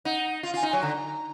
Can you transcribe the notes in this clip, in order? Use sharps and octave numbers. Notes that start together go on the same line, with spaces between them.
D#4 F#5
F4 F5
F4 G#5
D#4
F#3 G#5
D3 A#5